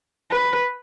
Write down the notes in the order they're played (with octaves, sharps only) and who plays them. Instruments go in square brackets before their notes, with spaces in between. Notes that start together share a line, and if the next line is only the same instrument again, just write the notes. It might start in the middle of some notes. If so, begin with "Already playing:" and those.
[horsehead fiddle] B4